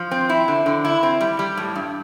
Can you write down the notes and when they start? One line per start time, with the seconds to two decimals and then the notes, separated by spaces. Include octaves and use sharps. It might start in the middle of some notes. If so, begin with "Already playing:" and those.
Already playing: F3
0.11 C4
0.29 E4
0.48 D3
0.66 D3
0.85 E4
1.03 C4
1.21 G3
1.39 G3
1.57 A2
1.75 G2